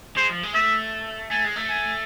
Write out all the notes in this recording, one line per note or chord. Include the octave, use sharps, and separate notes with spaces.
G#3 C5
F3
G#3
A3 E5
A3 G#5
G#3
A3
G#5